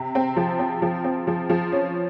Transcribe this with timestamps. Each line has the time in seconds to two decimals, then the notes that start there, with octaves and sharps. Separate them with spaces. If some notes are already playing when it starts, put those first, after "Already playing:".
Already playing: C3
0.15 C4
0.37 F3
0.59 C4
0.82 F3
1.04 C4
1.27 F3
1.50 F3
1.72 C#4